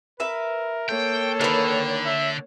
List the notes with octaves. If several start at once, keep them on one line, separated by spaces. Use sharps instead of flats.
A#4 B4 E5
A#3 A4 C#5 G5
D3 D#3 B4
E5